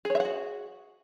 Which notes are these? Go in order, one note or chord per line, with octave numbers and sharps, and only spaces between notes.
F#4 G#4 C#5 E5 F#5